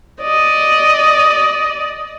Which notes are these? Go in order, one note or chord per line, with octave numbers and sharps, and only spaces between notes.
D5 D#5